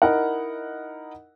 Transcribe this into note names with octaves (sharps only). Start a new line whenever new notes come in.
D#4 E4 A#4 F#5